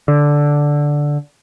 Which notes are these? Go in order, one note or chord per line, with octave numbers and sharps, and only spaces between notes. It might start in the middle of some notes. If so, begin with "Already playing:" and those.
D3